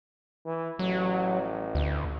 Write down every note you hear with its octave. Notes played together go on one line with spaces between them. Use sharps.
E3
A1 F#3
D2